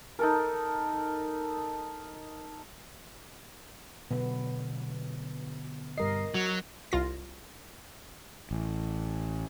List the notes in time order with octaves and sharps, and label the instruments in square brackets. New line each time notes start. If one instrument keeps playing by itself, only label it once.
[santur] D#4 A4 A#4
[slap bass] B2 D3 F#3 [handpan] B3
[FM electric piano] G2 G3 C7 [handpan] A#4 D#5
[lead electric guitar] F#3 [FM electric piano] F#4
[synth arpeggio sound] C2 F4 A#6
[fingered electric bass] A1